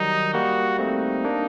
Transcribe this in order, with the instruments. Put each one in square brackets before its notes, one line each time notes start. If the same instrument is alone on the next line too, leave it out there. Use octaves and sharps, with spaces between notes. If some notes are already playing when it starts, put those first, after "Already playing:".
Already playing: [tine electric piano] D#3 F#3 G3 [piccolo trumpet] D#4
[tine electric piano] G3 A#3 [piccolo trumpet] F#4
[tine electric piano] A3 C4 [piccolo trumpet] D#4
[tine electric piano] A#3 D4